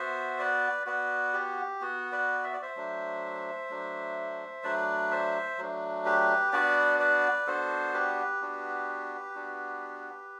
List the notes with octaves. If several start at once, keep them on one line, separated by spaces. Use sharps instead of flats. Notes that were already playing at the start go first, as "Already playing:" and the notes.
Already playing: B3 F#4 C5 E5
B4 D5
B3 F#4 B4 D5
G4
B3 F#4
B4 D5
E5
D5
C5 E5
F#3 A3 D4
F#3 A3 D4
F#3 A3 D4 B4 D5
C5 E5
F#3 A3 D4
G4 B4
B3 D4 F#4 B4 D5
B4 D5
B3 D4 F#4 A4 C5
G4 B4
B3 D4 F#4
B3 D4 F#4